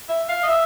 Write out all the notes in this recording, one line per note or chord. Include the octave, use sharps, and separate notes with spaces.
E5
F5
D#5
E5